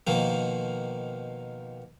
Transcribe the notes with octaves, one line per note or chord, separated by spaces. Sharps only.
B2 D#3 F3 A#3